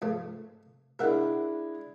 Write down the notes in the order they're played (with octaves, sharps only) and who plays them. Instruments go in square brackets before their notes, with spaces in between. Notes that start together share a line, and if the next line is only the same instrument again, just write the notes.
[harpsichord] G#2 F3 A3
[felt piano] G#3 D4 E4 [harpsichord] A#4 E5 F#5